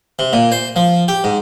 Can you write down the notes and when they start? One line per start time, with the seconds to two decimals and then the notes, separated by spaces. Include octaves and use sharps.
0.19 C3
0.33 A#2
0.52 C5
0.76 F3
1.08 G4
1.24 G#2